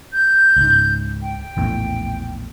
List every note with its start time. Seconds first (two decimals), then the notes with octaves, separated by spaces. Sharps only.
0.13 G6
0.56 C#2 G#2
1.22 G5
1.57 A#1 E2 A2